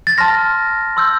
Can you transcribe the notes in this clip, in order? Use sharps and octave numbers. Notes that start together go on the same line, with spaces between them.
A6
A5 C6 F6 A#6
C6 E6 G6